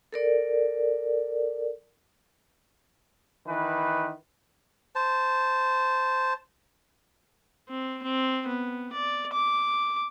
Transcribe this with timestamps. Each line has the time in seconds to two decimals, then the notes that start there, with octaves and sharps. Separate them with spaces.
0.13 A4 A#4 D5
3.46 D#3 E3 B4
4.95 C5 A5
7.68 C4
8.02 C4
8.47 B3
8.92 D5
9.33 D6